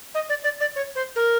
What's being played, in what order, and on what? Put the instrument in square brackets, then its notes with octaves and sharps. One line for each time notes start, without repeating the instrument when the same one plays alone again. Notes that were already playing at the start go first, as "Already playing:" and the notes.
[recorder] D#5
D5
D5
D5
C#5
C5
A#4